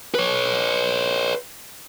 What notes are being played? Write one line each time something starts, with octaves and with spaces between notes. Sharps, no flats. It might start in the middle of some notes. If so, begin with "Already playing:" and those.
B4 C#5